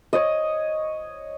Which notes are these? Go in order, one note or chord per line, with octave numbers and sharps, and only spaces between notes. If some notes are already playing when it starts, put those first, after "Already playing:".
C#5 D#5